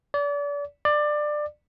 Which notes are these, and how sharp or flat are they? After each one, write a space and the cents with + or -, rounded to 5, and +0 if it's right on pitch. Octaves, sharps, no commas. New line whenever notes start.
D5 -35
D5 +20